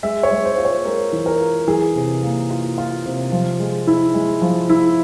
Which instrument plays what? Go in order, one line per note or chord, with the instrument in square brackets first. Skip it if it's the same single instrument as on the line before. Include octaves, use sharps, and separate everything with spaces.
[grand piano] G#3 E5
C#5
G#3
C5
F4
C#5
G#3 A#4
E3
A#4
F4
E3 G#4
C3
A#3
F4
F4
C3
F3
G#3
E4
G#3
F3
E4